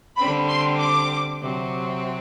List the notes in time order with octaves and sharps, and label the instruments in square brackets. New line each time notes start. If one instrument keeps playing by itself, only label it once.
[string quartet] D3 G3 C4 [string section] B5
[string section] C6
D6
[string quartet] C3 F#3 C4